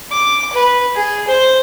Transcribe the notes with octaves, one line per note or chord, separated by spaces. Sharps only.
D6
B4
G#4
C5